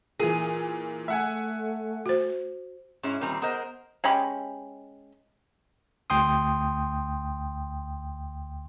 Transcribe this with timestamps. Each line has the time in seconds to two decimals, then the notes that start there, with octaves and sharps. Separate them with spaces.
0.20 A#2 E3 G#4
1.08 A3 E5 F#5 G#5
2.06 F#4 C5
3.03 G#2 C#4 E4 G#4 C#5
3.21 A#2 D#3 G3 C4 A#5
3.42 B3 G#4 A#4 C5 D#5
4.04 G#3 C#4 G4 B5
6.10 D2 G5 C6 D#6